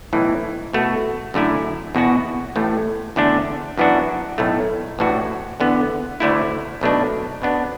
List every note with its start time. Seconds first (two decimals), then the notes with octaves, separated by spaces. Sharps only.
0.13 B1 A2 E3
0.73 B2 A3 F#4
1.34 F#2 D3 A3 E4
1.95 E2 B2 B3 F#4
2.56 A1 A2 A3
3.16 E2 D3 A3 D4
3.78 F#2 E3 B3 D4 F#4
4.38 B1 A2 A3
4.99 A1 A2 E3 D4 F#4
5.60 E2 D3 B3
6.20 D2 D3 A3 E4
6.81 B1 B2 A3 D4
7.42 B2 B3 D4